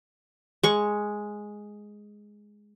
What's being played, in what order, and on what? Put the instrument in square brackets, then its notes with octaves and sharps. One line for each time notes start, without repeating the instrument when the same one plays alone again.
[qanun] G#3 C#6